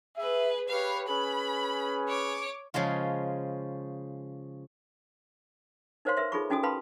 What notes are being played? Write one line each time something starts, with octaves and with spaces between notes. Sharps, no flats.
G#4 B4 E5
G4 B4 C#5 F5
C#4 G#4 B4 B5
C#5 D6
C#3 F3 G#3 F4
D#4 A#4 C5 C#5 F5 C6
A#4 B4 E5 C6
D#4 F4 G#4 A4 B5 C#6
C#4 D#4 F#4 A4 G#5 D#6
A#4 B4 F5 A5 B5 C6